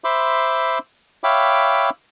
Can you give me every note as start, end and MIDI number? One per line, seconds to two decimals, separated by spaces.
0.04 0.79 72
0.04 0.79 76
0.04 0.79 83
0.04 0.79 84
0.04 0.79 86
1.24 1.90 73
1.24 1.90 76
1.24 1.90 77
1.24 1.90 79
1.24 1.90 83
1.24 1.90 86